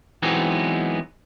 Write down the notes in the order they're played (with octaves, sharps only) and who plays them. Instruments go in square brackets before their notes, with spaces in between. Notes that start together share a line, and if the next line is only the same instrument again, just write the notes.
[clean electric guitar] E3 F#3 G#3 B3 C4 D#4